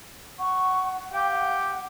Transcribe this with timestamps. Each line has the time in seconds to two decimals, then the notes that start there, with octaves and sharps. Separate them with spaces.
0.39 F#5 C#6
1.13 G4 F5 G5
1.32 F#5